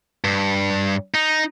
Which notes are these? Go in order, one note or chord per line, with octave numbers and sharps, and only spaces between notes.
G2
D#4